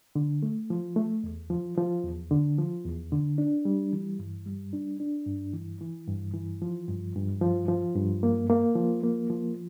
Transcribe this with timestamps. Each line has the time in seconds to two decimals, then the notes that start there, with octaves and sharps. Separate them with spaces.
0.15 D3
0.43 A3
0.70 F3
0.96 A3
1.24 E2
1.50 F3
1.78 F3
2.04 E2
2.31 D3
2.58 F3
2.85 E2
3.12 D3
3.38 D4
3.65 G3
3.93 E3
4.19 G2
4.46 G3
4.73 D4
5.00 D4
5.26 G2
5.53 E3
5.81 E3
6.08 G2
6.34 E3
6.62 F3
6.88 G2
7.15 G2
7.41 F3
7.68 F3
7.96 G2
8.23 A#3
8.50 A#3
8.76 F3
9.03 A#3
9.30 F3